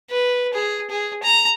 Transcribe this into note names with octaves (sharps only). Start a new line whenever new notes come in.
B4
G#4
G#4
A#5